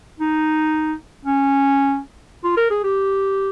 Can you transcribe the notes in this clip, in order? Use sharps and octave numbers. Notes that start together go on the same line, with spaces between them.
D#4
C#4
F4
A#4
G#4
G4